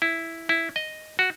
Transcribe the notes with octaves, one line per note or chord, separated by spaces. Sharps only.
E4
E4
D#5
F#4